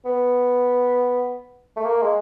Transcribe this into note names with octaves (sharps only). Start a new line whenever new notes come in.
B3
A3
A#3
G#3